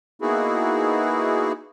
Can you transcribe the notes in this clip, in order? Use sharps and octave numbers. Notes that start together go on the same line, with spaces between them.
A#3 B3 D#4 E4 F#4 G#4